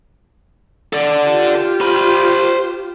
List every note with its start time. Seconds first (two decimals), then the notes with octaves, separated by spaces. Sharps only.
0.93 A4 D5
1.26 F4 G4
1.81 C5 B5